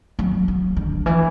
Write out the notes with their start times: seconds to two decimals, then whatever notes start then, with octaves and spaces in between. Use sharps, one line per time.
0.19 F#3
0.48 F#3
0.77 D3
1.06 E3